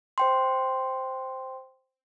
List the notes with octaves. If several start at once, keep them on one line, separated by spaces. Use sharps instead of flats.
C5 G5 C6